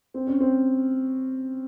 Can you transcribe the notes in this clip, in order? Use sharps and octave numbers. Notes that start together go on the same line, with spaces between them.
C4
C#4
C4